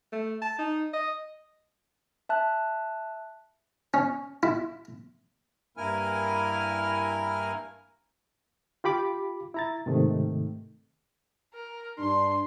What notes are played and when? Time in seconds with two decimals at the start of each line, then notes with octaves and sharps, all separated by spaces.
0.12 A3
0.42 A5
0.58 D#4
0.93 D#5
2.29 E5 A5 F#6
3.94 C#4
4.43 E4
5.77 G2 A#3 E4 A#4 G#5 F6
8.84 F4 G4 B5 D6
9.54 E4 A#5 A6
9.86 G#2 C3 D#3 A3
11.54 A#4
11.99 G2 D4 C6